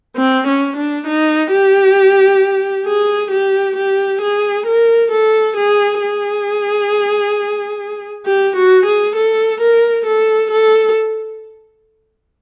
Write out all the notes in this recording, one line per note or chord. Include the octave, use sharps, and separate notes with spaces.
C4
C#4
D4
D#4
G4
G#4
G4
G4
G#4
A#4
A4
G#4
G#4
G4
F#4
G#4
A4
A#4
A4
A4